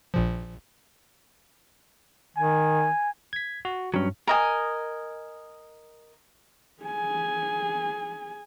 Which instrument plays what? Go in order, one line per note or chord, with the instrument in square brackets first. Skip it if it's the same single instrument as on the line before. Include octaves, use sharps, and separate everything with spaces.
[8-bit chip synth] A#1 A#2 F3
[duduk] D#3 [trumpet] G#5
[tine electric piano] G#6 B6
F#4
[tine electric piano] G2 [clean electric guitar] F#3 C#4
[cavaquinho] A#4 D#5 G#5
[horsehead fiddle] G#4 G#5